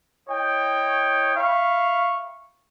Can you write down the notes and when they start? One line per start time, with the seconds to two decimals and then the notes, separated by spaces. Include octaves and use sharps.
0.29 E4 C#5 D#5 G5
1.36 E5 F5 B5 C#6